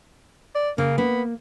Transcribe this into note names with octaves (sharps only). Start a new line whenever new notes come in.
D5
C#3 A#3
A#3 B3